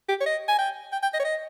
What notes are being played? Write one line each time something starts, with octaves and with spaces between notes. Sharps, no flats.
G4
C#5
D#5
G#5
G5
G5
G5
D#5
C#5
D#5